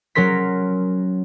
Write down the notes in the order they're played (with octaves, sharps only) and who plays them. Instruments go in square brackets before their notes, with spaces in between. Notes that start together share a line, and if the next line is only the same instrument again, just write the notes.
[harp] F#3 C#4 A#4 C6 B6